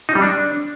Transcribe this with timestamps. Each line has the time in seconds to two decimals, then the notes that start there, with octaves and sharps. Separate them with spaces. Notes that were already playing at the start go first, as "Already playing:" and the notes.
0.09 D#4
0.15 G3
0.22 D4